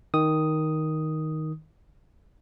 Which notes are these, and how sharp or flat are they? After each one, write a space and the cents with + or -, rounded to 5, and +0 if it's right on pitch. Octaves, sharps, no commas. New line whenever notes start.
D#3 +5 D#6 +0